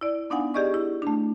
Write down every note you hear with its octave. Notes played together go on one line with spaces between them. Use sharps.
E4 D5
B3 D4 D#4 F5 F#5 G#5
G4 G#4 D5 D#5 C#6
E4
A3 D4